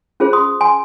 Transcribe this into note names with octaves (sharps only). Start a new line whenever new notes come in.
C#4 F4 G#4 C5
C6 D#6
G#5 C6